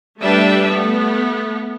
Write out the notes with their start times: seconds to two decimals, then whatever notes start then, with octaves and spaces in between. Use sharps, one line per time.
0.21 G3 A3 D4 G4 B4 E5
0.69 A3 B3